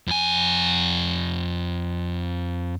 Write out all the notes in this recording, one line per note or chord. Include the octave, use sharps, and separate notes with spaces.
F2 G#5